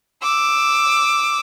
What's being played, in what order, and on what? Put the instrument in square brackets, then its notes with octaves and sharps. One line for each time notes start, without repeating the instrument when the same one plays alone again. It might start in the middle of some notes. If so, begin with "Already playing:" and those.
[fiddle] D6 E6